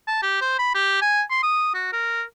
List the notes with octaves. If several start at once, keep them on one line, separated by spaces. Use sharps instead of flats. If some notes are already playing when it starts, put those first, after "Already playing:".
A5
G4
C5
B5
G4
G#5
C6
D#6
F#4
A#4